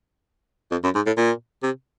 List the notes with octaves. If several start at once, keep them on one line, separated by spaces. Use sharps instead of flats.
F2
F#2
G#2
A2
A#2
C3